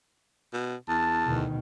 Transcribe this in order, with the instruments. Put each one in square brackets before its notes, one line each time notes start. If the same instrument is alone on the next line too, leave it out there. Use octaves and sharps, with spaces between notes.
[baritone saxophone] B2
[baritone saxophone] E2 [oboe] A5
[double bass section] D2 B2 D#3